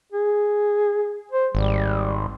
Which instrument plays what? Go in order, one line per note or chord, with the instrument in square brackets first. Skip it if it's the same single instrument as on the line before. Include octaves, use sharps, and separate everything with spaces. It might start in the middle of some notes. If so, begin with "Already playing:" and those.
[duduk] G#4
C5
[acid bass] G#1 [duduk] G3